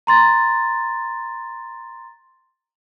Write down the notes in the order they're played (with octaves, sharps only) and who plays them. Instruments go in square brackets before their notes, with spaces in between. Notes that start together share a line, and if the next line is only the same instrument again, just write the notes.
[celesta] A#5 C6 A6